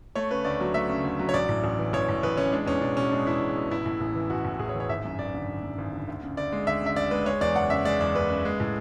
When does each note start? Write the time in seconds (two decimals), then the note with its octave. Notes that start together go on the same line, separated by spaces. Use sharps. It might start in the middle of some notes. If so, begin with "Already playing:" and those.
0.15 A3 C#5
0.31 C#3 B4
0.44 D2 D5
0.60 F#3
0.74 A3 E5
0.89 C#3
1.04 D2
1.19 F#3
1.29 C#5
1.34 A1 D5
1.49 A2
1.64 A1
1.79 E3
1.93 A1 C#5
2.09 A2
2.23 A1 B4
2.37 E3 C#4
2.52 G#3 D4
2.67 E2 C#4
2.81 E1 D4
2.97 B2 C#4
3.12 G#3 D4
3.26 E2 E4
3.41 E1
3.56 B2
3.71 A1 E4
3.86 A2
4.01 A1
4.15 E3
4.30 A1 F#4
4.45 A2
4.59 A1 G#4
4.69 C#5
4.75 E3
4.80 C#5
4.89 G#1 E5
5.04 F#2
5.19 G#1 D5
5.34 D3
5.48 G#1
5.63 F#2
5.78 G#1
5.93 D3
6.08 D2
6.23 C#3
6.37 D2 D5
6.52 G#3
6.67 D2 E5
6.82 C#3 E5
6.96 D2 D5
7.11 G#3 B4
7.26 G#3 C#5
7.41 E2 D5
7.55 F#1 F#5
7.70 C#3 E5
7.85 G#3 D5
8.00 E2 D5
8.15 F#1 B4
8.30 C#3
8.45 G#3
8.60 A2